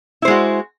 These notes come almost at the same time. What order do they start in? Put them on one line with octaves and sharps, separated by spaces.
E4 C5 G#3 F#4